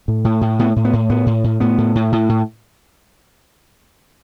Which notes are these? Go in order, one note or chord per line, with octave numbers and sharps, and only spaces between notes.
A2
A2
A2
A2 B3
A2
B3
A2
A2 B3
A2
A2
A2 B3
A2
A2
A2
A2